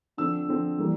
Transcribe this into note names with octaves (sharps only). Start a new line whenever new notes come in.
D3 F3 C4 E6
D3 F3 C4
E3 G3 A#3